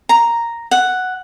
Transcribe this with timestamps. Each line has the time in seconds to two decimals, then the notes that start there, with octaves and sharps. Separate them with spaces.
0.09 A#5
0.71 F#5